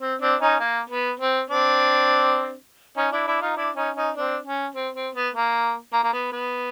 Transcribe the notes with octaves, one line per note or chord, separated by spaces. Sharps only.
C4
C4 D4
C#4 D#4
A#3
B3
C4
C4 D4
C#4 D#4
D4 E4
D4 E4
D#4 F4
D4 E4
C#4 D#4
C#4 D#4
C4 D4
C#4
C4
C4
B3
A#3
A#3
A#3
B3
B3